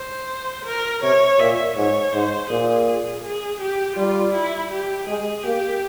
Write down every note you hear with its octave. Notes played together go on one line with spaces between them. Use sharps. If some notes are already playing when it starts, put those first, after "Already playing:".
Already playing: C5
A#4
C3 C#5
A#2 E5
G#2 C#5
G#2 C5
A#2 G#4
G#4
G4
G3 F4
E4
G4
G#3 G#4
A#3 G4